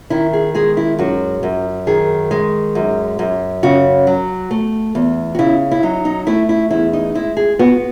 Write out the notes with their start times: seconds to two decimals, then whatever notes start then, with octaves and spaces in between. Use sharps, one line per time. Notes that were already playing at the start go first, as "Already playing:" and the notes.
0.10 D#3 E4
0.33 G#4
0.55 G#3 G#4
0.77 E4
0.99 F#2 F#4
1.43 F#2
1.87 D#3 G#4
2.31 G#3
2.75 F#2
3.19 F#2
3.63 C#3 F#4
4.07 F#3
4.51 A3
4.95 E2
5.35 F#4
5.39 C#3 E4
5.71 E4
5.83 F#3 D#4
6.05 D#4
6.27 A3 E4
6.49 E4
6.71 E2 E4
6.93 D#4
7.15 G#3 E4
7.37 G#4
7.59 B3 F#4